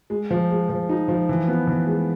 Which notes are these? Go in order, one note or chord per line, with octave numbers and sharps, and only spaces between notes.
G#3
F3
G#3
F3
D#4
F3
E3
B3
E3
G#3